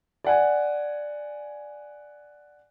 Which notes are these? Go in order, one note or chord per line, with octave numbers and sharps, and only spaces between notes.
D5 F#5 G#5